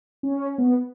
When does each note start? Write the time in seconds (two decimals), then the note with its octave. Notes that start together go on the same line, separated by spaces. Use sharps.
0.23 C#4
0.58 B3